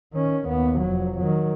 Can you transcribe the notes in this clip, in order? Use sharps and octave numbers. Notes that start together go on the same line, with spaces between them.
D#3 C#4
D#2 B3
F1 F#3
D#3 F#3